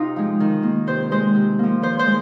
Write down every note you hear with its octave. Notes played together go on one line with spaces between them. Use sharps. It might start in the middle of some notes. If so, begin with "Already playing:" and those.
Already playing: C3 D#4 F4
F3 G#3
D#3
A#3
C3 C5
G#3 C5
C3
F3 A#3
D#3 C5
C5
G#3